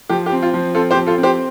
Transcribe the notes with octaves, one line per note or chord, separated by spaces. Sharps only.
F3 G4
G4
C4
F4
F3
C4 F4 A4
G4 C5
F3
F4 A4
C4
G4 C5